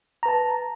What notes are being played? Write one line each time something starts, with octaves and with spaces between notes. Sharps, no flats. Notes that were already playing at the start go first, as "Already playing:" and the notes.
B4 A5 A#5